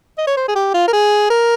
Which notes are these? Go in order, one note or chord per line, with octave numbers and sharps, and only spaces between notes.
D#5
C#5
C5
G#4
G4
F4
A#4
G#4
A#4